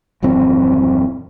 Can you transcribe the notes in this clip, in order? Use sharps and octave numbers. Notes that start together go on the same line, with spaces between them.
D#1 F#2 E3 C4